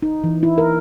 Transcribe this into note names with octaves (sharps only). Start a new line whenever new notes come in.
D#4
E3
E4
A#4